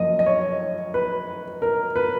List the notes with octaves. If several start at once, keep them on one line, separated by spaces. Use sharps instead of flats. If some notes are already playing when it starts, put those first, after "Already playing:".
Already playing: F#2 F3 A#3 D#5
D#5
C#5
B4
A#4
B4